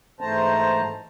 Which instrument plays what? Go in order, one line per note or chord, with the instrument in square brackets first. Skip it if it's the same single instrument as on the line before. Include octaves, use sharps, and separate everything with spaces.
[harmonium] G#2 E3 A3 C5 A5 A#5